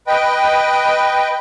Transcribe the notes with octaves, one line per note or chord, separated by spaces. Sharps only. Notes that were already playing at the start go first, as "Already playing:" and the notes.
B4 D#5 G5